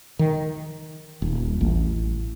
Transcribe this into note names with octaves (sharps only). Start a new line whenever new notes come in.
D#3
D#1
A1